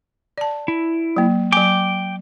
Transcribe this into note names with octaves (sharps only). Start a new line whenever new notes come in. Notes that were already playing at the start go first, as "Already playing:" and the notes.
D5 A5
E4
F#3 A#3
F#3 G5 G#5 D6